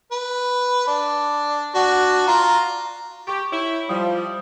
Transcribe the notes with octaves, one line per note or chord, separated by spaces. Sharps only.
B4
D4
D4 F#4
F4 A#5
G4 C#6
E4 C#5
F3 G3 D#6